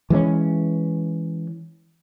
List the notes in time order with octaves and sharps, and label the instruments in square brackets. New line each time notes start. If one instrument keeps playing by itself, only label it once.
[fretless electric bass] E3 G#3 C4 C#4